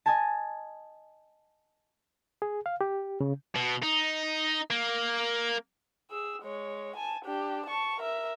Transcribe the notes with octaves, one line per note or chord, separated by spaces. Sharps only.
D#5 G#5 A5
G#4
F5
G4
C#3
B2
D#4
A#3
G#4 E6
G#3 C#5
G#5 A5
D4 G4
A5 C#6
A#4 E5